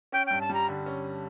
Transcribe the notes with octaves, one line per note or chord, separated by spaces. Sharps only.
C#4 G5
G2 G5
A5
G3 A#5
D3
C#4